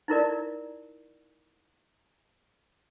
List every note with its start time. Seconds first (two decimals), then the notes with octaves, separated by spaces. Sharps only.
0.08 D#4 E4 A#4 D5